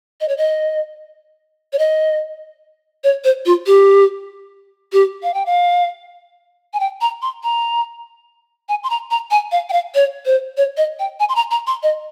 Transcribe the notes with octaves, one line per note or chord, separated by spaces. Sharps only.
D#5
C#5
D#5
C#5
D#5
C#5
C5
F4
G4
G4
F5
G5
F5
G#5
G5
A#5
C6
A#5
G#5
C6
A#5
A#5
G#5
F5
G5
F5
C#5
C5
C#5
D#5
G5
G#5
C6
A#5
A#5
C6
D#5